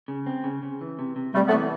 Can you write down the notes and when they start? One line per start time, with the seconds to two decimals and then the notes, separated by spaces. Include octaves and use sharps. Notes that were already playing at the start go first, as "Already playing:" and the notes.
0.08 C#3
0.26 C4
0.44 C#3
0.63 C#3
0.81 E3
0.99 C3
1.16 C3
1.34 C3 G3 A3
1.47 A3 B3
1.53 E3